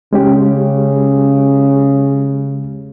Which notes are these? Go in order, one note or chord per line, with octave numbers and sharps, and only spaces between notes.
C#3 G#3 C#4 G4